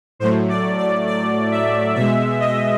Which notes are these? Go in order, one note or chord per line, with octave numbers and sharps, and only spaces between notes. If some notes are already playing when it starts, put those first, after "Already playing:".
A2 F#3 A3 C5
D5
D5
D5
E5
B2 G#3 E5
D#5